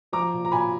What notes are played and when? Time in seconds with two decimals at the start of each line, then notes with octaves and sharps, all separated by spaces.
0.13 F3 A#5 D6
0.33 A#2
0.45 A#5
0.52 A#2 G#5 B5